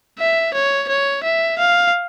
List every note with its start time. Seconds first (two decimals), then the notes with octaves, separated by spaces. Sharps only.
0.19 E5
0.54 C#5
0.89 C#5
1.24 E5
1.59 F5